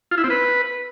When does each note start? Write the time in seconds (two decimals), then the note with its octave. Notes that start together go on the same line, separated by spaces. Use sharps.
0.11 F4
0.18 E4
0.24 C4
0.30 B4